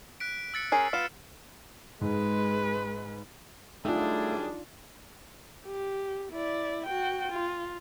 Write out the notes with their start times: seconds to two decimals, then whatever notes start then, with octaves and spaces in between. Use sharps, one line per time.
0.20 F#6 B6 D7
0.54 E6 A6 C#7
0.72 C#4 G#4 A#4 C7
0.93 B3 F4 F6 C7 E7
2.01 G#2 G#3 B4
3.85 F#2 G3 A3 D4 D#4 F4 G#4
5.66 G4
6.32 E4 D5
6.86 F#4 G5
7.32 F4